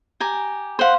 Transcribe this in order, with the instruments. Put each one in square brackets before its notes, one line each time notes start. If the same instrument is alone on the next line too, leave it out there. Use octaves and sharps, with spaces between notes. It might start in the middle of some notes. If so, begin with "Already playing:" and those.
[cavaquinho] G4 G#5 A#5
[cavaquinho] C5 F#5 [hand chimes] F5 C6